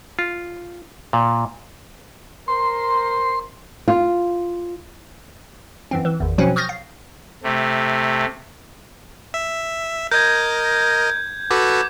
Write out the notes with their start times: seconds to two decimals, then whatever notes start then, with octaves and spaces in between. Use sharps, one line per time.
0.19 F4
1.13 A#2
2.48 A#4 C5 C6
3.88 F4
5.91 F#2 E3 C4
6.05 E3
6.20 G#1 E2
6.38 B2 F3 F#3 C4 C#4
6.56 C#6 D#6 F6 G6 A6 A#6
6.69 F5
7.43 C3 A3
9.34 E5
10.11 A#4 D#5 G6 G#6
11.50 F#4 A4 B4 D6